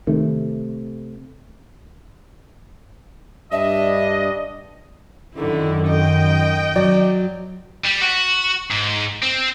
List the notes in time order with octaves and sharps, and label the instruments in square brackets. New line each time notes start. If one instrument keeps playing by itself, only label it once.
[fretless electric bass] C3 A3 [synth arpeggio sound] D#3
[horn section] G2 D4 D#5 [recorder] E5
[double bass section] F#2 D#3 [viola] D3 E4
[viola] D#5 G5
[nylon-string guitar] F#3 [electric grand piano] D5
[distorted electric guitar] G3
F#4
G#2
C4